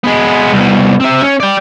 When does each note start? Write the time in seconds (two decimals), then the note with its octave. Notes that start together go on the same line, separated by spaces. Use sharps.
0.04 G#3 B3
0.52 C2 B2
1.01 C4 E5
1.23 C#4
1.40 D5 G5